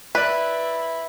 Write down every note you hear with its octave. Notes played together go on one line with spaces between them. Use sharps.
E4 B4 D5 E5